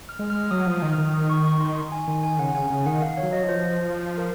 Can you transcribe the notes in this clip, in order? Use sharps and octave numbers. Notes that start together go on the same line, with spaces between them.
F6
G#3
F6
F#3 D#6
F3 D#6
D#3
F6
D#3
D#6
C#6
C#6
C6
G#5
D#3 G#5
G#5
C#3 F#5
C#3 G#5
C#3
D#3 F#5
F5
C#5
F#3
D#5
F3
C5
A#4